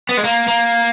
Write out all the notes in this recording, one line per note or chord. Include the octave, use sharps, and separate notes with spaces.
B3
G#3
A#3
A#3